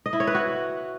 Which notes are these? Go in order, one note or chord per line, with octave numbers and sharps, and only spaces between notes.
D#5
E4
C#5
B4
F#4